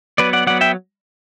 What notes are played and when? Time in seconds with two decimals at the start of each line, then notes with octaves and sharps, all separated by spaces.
0.18 F#3 B3 B4 D5
0.33 D5 F#5
0.47 F#3 B3 D5 F#5
0.61 E5 G5